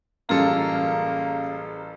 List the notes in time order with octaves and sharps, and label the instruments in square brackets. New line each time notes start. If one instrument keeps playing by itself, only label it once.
[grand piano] A1 F4 A4 [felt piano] F#2 G3 [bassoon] A#3 [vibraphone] G#4 A#5